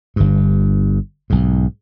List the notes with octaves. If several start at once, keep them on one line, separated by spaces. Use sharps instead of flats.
G1 G2
B1 G#2